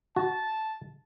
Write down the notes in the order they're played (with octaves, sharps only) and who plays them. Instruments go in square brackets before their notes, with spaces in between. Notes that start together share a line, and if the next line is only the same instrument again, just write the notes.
[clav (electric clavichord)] F#4 [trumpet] A5